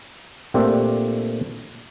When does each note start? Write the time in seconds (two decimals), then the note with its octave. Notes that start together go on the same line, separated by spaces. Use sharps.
0.54 A#2 A3 C4 D4 G4 A4